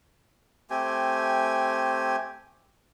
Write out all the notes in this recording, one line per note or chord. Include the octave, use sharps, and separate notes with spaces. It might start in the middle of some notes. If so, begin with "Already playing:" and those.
A3 C4 G4 G#5